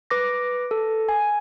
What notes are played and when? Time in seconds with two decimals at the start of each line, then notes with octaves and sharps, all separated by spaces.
0.10 B4 D6 A#6
0.71 A4
1.09 G#5